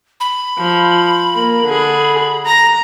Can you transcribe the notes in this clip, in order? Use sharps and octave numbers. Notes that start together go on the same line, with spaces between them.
B5
F3
A#3
D3 G#4
A#5 A#6